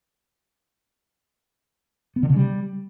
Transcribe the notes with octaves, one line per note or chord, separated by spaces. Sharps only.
B3
D3
C#3
G3